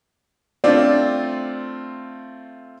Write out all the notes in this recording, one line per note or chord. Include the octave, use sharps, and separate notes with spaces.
A3 C4 D4 F4 D5